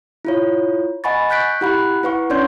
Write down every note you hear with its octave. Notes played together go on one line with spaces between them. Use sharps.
E4 F4 C#5
D#5 F#5 G#5 B5 C#6 A6
C#6 F#6 G6 B6 D7
E4 G4 F#5 B5 F#6
E4 B4 F#5 C#6
C#4 D4 C#5 D5 C6 G6